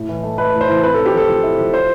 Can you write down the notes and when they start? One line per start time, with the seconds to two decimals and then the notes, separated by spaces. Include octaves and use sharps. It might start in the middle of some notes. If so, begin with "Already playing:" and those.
Already playing: A2
0.09 E3
0.23 A3
0.38 A3 B4
0.54 A2
0.61 C5
0.68 E3
0.83 C4 B4
0.94 A4
0.99 C4
1.06 G4
1.14 F3 A4
1.29 F3
1.43 E4
1.58 F3
1.74 F4 C5